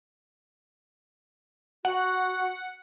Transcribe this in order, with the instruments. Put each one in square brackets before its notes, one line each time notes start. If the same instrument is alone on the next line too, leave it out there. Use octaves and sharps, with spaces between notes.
[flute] F#4 [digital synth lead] F#5